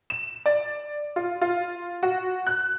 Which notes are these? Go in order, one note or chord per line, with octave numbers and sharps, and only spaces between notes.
E7
D5
F4
F4
F#4
F#6